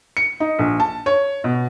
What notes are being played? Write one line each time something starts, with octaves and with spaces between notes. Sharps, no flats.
C#7
D#4
A#1
A5
C#5
B2